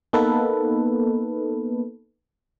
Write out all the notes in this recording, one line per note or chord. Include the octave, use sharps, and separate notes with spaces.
A#3 B3 D#4 A4 B4